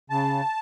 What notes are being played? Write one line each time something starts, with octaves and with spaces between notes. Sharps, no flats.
C#3 A5